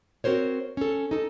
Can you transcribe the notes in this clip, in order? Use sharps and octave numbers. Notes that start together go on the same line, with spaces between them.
C4 F#4 A#4 C5 C#5
C#4 A4
D#4 A4